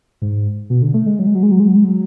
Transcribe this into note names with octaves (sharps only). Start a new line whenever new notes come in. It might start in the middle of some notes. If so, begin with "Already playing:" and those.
G#2
B2
D3
A3
G#3
F#3
G#3
F#3
G#3
F#3
G#3
F#3
G#3
F#3